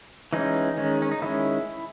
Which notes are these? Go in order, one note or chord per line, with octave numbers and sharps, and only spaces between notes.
E3 G#3 C#4 D#4
D#3 G#3 C#4
C#4
D#4
D#3 G#3 C#4 E4